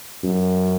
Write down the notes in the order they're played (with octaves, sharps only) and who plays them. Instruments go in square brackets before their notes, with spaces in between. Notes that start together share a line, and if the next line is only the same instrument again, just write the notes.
[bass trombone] F#2